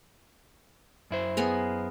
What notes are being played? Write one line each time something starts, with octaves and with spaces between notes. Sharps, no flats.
F#2 E4 C5
B3 G#4 A#4